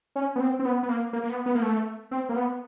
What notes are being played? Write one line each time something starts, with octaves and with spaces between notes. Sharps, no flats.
C#4
B3
C4
C4
B3
B3
A#3
A#3
A#3
B3
B3
A#3
A3
C4
A#3
B3